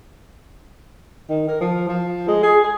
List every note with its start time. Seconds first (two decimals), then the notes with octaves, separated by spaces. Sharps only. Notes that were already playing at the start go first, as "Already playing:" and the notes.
1.30 D#3
1.48 A#4
1.61 F3
1.89 F3
2.28 G#3
2.43 G#4
2.64 G#4